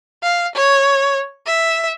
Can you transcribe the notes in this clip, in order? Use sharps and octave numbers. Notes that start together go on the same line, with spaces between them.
F5
C#5
E5